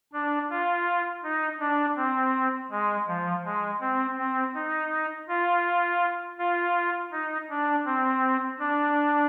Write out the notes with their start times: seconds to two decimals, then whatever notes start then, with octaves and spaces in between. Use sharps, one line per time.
0.13 D4
0.50 F4
1.24 D#4
1.60 D4
1.97 C4
2.71 G#3
3.08 F3
3.45 G#3
3.81 C4
4.18 C4
4.55 D#4
5.28 F4
6.38 F4
7.12 D#4
7.50 D4
7.86 C4
8.59 D4